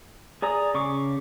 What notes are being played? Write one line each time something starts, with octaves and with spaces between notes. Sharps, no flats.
G#4 D5 A#5 D#6
C#3 C#6 D6